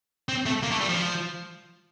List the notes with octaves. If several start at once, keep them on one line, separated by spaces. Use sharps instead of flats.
C4
A3
A#3
A3
G3
F3